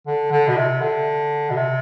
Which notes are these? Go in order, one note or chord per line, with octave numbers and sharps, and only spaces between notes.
D3
D3
B2
C3
D3
B2
C3